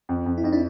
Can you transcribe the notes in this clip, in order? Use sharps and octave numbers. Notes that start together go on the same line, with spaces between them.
F2
F2
E4
F2 D#4
D4 E4